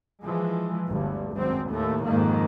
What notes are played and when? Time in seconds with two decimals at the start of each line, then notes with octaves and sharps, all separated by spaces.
0.22 E3 F3 G#3
0.87 G1 D2 G2
1.33 G#1 F#2 C4
1.68 D#2 A2 A3
2.05 F2 G#2 D#3 A#3